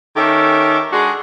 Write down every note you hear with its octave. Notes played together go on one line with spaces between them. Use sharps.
D#3 C#4 G4 A4 E5
G#3 D4 F#4 G#4